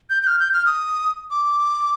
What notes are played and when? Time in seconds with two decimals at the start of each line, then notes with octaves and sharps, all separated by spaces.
0.10 G6
0.23 G6
0.27 F6
0.40 G6
0.54 F6
0.66 D#6
1.31 D6